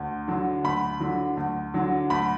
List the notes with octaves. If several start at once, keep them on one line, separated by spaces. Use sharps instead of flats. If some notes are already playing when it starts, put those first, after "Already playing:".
Already playing: D2
D3 F#3
D2 B5
D3 F#3
D2
D3 F#3
D2 B5